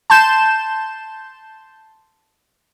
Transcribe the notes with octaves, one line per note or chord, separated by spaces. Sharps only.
A5 C6 G6 E7